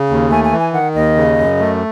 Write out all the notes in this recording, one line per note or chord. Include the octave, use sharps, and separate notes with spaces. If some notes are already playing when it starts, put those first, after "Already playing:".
Already playing: C#3
D#2
A3 G#5
G#5
E3
G#5
D#3 F#5
D#2 D#5
C#3
F#2
A3